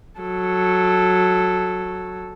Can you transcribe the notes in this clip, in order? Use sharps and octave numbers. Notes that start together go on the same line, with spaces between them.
F#3 A4